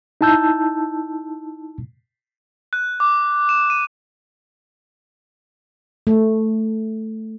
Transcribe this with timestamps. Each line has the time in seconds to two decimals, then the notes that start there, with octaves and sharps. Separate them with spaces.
0.21 D#4 E4 A5 E6 G6
2.73 F#6
3.00 D6
3.49 E7
3.70 D#7
6.07 A3